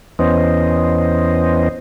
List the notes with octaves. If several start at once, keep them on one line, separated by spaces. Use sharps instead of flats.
E2 E3 B3 C#4 C5 D#5